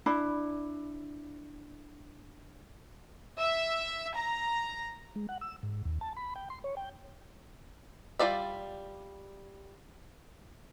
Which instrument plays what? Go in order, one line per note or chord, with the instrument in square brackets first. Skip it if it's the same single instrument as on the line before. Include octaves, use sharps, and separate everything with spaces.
[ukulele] D4 E4 B5
[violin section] E5
A#5
[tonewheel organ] G#3
F#5
E6
G#2
D#2
A5
B5
G5
C6
C#5
G5
[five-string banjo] G3 F4 A4 D5 E5